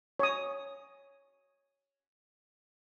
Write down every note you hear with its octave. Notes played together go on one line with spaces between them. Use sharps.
C#5 D#6